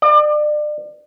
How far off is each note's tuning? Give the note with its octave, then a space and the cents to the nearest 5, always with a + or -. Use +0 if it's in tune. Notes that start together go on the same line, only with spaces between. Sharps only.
D5 +35